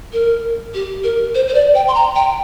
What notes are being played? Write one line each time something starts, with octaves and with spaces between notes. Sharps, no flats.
A#4
G4
A#4
C5
C5
D5
G5
C6
A#5
G5